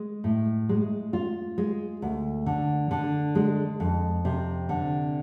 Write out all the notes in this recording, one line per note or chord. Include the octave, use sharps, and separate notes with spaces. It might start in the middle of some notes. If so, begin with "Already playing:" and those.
Already playing: G#3
A2
G#3
F4
G#3
D2
D3
D3
G#3
F2
C3
D3